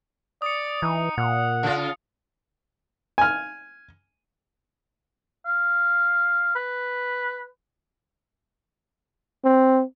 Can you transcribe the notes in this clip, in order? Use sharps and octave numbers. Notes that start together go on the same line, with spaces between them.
D5 D#6 C#7
E3 D#4
A#2 F#5
C#3 F4
G#5 F6
F5
B4
C4